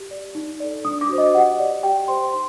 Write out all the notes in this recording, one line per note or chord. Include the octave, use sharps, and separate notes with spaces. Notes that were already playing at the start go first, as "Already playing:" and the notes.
Already playing: G4
D5
D#4
A4 D5
D4 D#6
D6
F#4 C5
D#5
G4 F#5
D5
G4 G5
C5 C6
D#4 C6